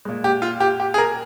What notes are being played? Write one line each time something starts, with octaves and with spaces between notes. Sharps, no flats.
A#2 G#3
G4
F4
G4
G4
G#4
A#4